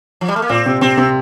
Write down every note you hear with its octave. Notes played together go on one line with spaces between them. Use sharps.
F3
G3
A3
A#3
A#2 C4
C3
C3 C4
C3